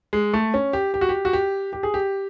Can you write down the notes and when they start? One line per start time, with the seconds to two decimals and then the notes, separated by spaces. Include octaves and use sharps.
0.13 G#3
0.33 A3
0.54 C#4
0.73 G4
0.94 G4
1.01 F#4
1.09 G4
1.25 F#4
1.33 G4
1.73 G4
1.83 G#4
1.94 G4